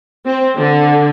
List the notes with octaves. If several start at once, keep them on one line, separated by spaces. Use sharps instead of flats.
C4
D3